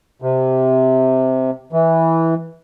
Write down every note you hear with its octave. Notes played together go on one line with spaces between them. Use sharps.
C3
E3